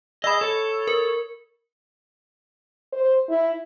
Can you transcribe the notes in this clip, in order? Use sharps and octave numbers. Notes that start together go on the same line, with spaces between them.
G#4 D#5 B5 E6
A4 C#5
A#4
C5
E4